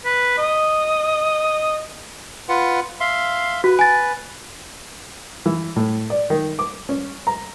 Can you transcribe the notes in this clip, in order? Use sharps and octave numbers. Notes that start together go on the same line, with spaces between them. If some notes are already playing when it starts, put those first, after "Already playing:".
B4
D#5
F4 B4 F#5
E5 F5 C6
F#4 B4
G#5 A6
E3
A2
D5
D#3
D6
C#4
A#5